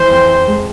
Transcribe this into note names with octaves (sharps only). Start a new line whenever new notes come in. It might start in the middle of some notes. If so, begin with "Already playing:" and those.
Already playing: E3 C5
F2
G#3